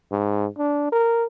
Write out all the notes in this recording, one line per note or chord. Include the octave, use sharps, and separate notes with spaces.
G#2
D4
A#4